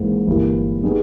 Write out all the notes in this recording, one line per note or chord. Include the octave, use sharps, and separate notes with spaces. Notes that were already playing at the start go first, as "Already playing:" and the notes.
Already playing: G#1 G#2 E3 A#3
G1 G2 E3 G3 A#3
G3 B3 D#4 G#4